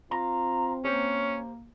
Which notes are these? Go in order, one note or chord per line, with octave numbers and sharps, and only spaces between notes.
C4 F4 A#5
A#3 C#4 G4 C5